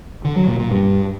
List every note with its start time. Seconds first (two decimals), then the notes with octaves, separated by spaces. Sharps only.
0.25 D3
0.36 F#3
0.48 A#2
0.59 A#2
0.71 G2